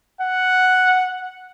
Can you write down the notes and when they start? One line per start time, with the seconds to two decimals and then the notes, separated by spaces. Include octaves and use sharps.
0.21 F#5